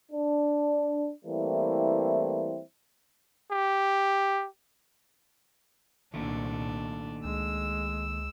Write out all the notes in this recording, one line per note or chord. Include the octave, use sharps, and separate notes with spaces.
D4
E3 G3 A3 A#3 C4 E4
G4
C2 A#2 D#3 A3 A#3 D4
C#2 G#3 E6